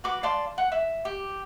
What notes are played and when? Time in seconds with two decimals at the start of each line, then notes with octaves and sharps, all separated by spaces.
0.04 F#4 B4 D6
0.23 D5 F5 A5 C6
0.58 F#5
0.72 E5
1.05 G4